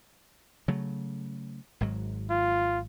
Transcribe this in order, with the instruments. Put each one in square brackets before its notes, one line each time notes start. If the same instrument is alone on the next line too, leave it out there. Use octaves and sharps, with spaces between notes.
[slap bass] C#3 F#3 A3
G#1 G#2 F#3
[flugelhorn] F4